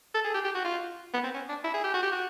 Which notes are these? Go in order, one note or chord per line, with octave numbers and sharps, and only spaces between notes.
A4
G#4
G4
G4
F#4
F4
B3
C4
C#4
D4
E4
G#4
G4
F#4
G4
F#4